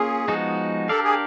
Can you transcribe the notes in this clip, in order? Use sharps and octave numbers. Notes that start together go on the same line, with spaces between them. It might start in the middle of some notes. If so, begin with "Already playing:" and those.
Already playing: A#3 C#4 F4 G#4
F3 G#3 B3 D#4 F#4
D4 G4 A4 A#4 D5 F5
G#4